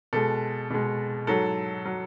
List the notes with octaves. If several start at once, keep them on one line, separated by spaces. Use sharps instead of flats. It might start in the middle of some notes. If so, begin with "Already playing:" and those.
B2 G#3 A4
B2 G#3
G#2 F#3 A4
F#3